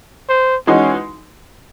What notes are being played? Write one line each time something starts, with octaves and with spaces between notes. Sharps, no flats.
C5
E3 G#3 C#4 D#4 F#4